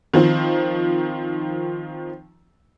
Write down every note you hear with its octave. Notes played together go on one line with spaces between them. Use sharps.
D#3 F3 C4